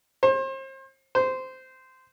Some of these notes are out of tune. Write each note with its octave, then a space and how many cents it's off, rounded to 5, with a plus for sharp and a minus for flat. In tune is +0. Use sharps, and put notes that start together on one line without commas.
C5 +35
C5 -15